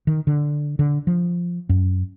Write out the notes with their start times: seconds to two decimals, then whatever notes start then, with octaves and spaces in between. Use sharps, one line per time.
0.07 D#3
0.27 D3
0.79 D3
1.07 F3
1.69 F#2